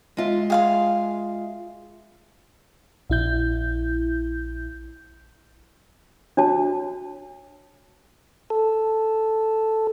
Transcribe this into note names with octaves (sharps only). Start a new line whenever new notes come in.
G#3 F4 E5
G#4 F5 C6
A#1 E4 G6
D4 F#4 C#5 A5
A4